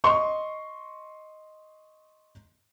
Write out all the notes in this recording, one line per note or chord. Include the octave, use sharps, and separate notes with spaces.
D#5 C6 C#6